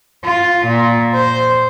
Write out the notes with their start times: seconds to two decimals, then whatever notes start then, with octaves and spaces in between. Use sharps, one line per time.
0.24 F4
0.66 A#2
1.14 C5